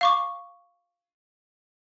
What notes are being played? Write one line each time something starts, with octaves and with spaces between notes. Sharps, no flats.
F5 C#6 D6